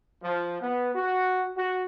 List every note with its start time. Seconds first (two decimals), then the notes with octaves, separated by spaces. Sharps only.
0.23 F3
0.61 B3
0.95 F#4
1.57 F#4